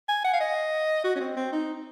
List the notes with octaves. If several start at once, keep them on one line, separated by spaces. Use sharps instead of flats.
G#5
F#5
F5
D#5
F#4
C#4
C4
C4
D#4